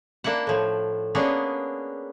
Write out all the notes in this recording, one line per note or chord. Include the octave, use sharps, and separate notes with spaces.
A#3 D4 E4 F#5
A2 F3
A#3 B3 C#4 D4 G#4